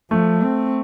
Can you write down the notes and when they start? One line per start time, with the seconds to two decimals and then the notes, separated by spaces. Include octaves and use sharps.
0.11 F3 A3
0.42 C4